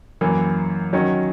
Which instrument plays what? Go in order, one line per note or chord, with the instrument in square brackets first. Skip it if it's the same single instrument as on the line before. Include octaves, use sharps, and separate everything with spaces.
[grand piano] F#2 E3 A#3
D#3 F#3 C#4